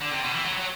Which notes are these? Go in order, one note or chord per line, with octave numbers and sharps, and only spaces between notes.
D3
C3
B2
E3
F#3
F#3